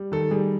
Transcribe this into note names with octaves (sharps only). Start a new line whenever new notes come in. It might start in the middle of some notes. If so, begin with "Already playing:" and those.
Already playing: G3
D#3 A4
G3 G#4